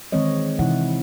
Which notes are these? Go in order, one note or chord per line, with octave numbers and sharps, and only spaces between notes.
D#3 E3 G#3 C4 C#5 D#5
C3 E3 G#3 D#4 E4 F#5